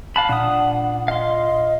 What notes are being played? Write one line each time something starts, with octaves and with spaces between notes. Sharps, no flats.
F5 A5 B5 F#6
A#2 D4 F#5 D#6
D#5 F5 C6